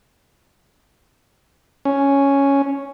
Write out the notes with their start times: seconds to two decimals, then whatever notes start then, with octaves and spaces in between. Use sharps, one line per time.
1.85 C#4